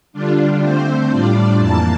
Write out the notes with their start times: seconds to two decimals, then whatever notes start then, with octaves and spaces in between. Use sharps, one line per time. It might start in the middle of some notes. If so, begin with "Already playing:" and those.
0.13 D3 G3 D4 F4
0.61 D3 A3 C4 C5
1.10 A2 G3 D4 F4 D5
1.58 F2 E3 A#3 A5